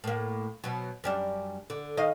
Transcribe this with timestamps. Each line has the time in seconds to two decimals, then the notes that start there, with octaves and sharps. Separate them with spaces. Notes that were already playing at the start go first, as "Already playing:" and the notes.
0.04 A2 A#3
0.64 B2 F#3
1.04 F#2 G3 D4
1.70 D3
1.97 D#3 D#5 F5